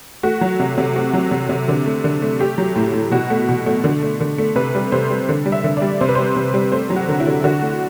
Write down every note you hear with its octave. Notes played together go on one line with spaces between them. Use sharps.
A3 F#4
F#3
C3
C3
A3 F#4
F#3
C3
C3
D3
A3
D3
A3
A3 G4
F#3
A2
A2
B2 F#4
A3
B2
A3
D3
A3
D3
A3
C3 B4
G3
C3 C5
G3
D3
G3
E5
D3
D5
G3
C3 C5
B4
G3 C5
C3
G3
A3 C5
F#3
F#4
D3
E4
D3
D3 F#4
A3